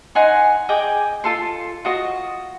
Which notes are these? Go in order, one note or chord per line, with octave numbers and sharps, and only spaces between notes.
D#4 F#5 G#5 C6
G#4 D#5 G5 D6
F4 A4 C6
F4 F#4 D#5